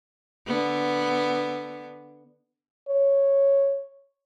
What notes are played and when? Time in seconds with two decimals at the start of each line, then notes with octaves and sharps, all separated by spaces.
0.47 D3 B3
2.88 C#5